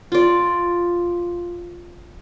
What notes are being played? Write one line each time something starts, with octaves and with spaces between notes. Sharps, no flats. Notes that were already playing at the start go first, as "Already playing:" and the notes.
F4 D5